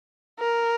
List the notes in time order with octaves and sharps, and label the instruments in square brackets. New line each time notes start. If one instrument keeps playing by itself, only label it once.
[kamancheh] A#4